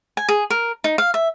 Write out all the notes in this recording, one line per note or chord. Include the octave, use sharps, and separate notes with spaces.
G#5
G#4
A#4
D#4
F5
E5